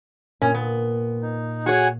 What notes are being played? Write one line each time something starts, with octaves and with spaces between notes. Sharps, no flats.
A#2 C#4
B3
D#4
F#4 G#4 C#5 F#5 G#5